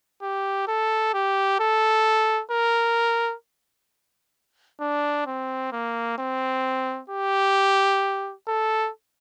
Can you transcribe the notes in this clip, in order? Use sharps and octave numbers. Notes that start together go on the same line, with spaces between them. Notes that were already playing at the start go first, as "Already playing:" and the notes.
G4
A4
G4
A4
A#4
D4
C4
A#3
C4
G4
A4